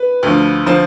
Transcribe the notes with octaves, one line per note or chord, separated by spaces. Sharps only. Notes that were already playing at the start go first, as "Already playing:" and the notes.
Already playing: B4
D2 D3 F3
D3 F3 C5